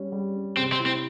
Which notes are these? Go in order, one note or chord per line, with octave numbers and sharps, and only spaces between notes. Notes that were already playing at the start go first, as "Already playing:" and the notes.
Already playing: G3 C#4
G3
C#4
C3 C4
C4
E4
C4